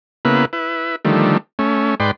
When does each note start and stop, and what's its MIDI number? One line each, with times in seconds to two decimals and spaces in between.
0.25 0.45 49
0.25 0.45 58
0.25 0.45 59
0.25 0.45 64
0.25 0.45 71
0.53 0.96 64
0.53 0.96 71
1.05 1.37 50
1.05 1.37 51
1.05 1.37 53
1.05 1.37 55
1.05 1.37 57
1.59 1.95 57
1.59 1.95 61
2.00 2.11 44
2.00 2.11 71
2.00 2.11 74
2.00 2.11 79
2.00 2.11 84